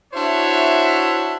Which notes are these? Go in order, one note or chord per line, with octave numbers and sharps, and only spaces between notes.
D4 E4 F#4 C5 C#5 E5